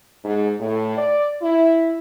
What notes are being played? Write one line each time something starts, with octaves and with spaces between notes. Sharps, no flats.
G#2
A2
D5
E4